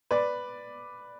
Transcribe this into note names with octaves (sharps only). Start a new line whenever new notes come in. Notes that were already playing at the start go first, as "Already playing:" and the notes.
B4 D5